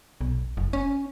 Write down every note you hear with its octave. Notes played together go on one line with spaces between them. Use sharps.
B1
F#1
C#4